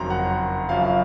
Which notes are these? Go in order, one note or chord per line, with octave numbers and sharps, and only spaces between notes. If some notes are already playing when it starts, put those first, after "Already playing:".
Already playing: F#1 F2 D#3 F#3 A#5 C6
F#5
F#1 F#2 F3 F5
F5